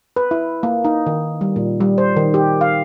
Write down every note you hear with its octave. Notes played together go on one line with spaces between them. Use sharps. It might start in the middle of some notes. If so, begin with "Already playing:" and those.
B4
E4
A#3
D#4
D#3
G3
A#2
G3
C5
D#3
G4
F5